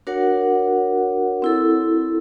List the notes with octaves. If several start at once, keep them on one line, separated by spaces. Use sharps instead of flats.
D4 F#4 A#4 C#5 F#5
C4 E4 A4